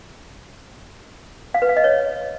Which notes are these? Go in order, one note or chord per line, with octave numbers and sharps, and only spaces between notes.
F5
B4
F5
D#5
C#5